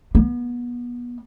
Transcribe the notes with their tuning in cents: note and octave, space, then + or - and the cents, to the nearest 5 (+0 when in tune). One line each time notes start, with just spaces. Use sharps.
B3 -30